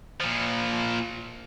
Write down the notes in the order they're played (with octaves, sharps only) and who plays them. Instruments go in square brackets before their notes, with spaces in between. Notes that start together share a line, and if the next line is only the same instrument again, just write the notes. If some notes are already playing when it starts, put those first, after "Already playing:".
[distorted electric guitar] A#2 F3